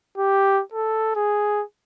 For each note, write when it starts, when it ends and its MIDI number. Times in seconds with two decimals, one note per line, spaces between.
0.17 0.62 67
0.73 1.11 69
1.15 1.63 68